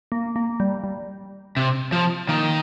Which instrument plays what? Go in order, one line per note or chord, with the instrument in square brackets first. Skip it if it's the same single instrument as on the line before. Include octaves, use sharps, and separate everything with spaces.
[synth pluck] A#3
A#3
G3
G3
[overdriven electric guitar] C3
F3
[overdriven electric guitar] D#3 [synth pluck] A#3